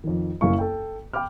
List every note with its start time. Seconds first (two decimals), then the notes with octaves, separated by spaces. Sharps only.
0.04 F2 D#3
0.41 F#1 F#2 E4 F5 C#6
0.59 A4 G5
1.13 G5 B5 D6 F6